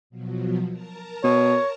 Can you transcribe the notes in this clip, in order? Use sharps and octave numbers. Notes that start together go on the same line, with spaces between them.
B2 F3 F#3
A#4 A5 A#5
B2 C#5